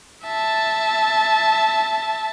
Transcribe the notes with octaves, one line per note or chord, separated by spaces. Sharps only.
E5 A5